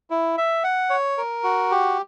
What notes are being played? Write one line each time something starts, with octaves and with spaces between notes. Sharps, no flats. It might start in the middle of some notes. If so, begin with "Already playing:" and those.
E4
E5
F#5
C#5
A#4
F#4
G4